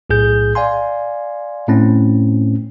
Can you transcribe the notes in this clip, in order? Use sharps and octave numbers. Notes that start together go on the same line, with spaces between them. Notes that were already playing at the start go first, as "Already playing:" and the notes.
B1 A2 G#4 G6
D5 F5 G#5 C6
A2 A3 C4 C#4